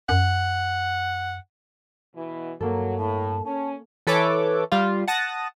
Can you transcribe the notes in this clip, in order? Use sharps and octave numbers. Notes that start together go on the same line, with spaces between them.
F#2 F#5
B2 E3
G2 F#3 A#3 A4
A2 A5
C#4 A5
E3 A4 B4 C#5 D6
G3 F4
F#5 A5 D#6 A#6